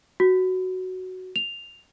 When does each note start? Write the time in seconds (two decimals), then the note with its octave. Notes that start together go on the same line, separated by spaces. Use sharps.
0.20 F#4
1.36 F7